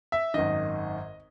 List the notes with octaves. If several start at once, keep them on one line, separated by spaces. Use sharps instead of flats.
E5
G#1 F#2 D#3 D#5